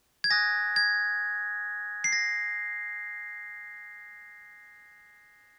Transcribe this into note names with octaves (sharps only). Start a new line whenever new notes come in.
G#6
G#5 D#6 F#6 A#6
G#6
C7
A#6